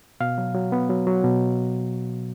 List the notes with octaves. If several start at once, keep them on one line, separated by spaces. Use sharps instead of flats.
B2 F5
F#3
F#3
B3
F#3
F#3
B2